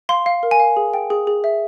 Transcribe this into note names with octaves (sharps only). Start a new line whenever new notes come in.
F5 C6
F5
A#4
G#5
F5
G#4
G5
G#4
G#4
E5